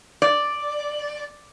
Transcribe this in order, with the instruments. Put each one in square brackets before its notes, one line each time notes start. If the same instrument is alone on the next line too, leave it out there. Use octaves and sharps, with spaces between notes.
[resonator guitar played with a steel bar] D5